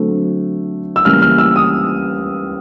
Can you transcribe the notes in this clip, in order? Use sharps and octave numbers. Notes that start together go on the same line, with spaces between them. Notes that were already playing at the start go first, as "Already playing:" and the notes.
Already playing: D3 F#3 A3 C4
E6
C#3 E3 G3 A#3 C#4 F6
F6
E6
D#6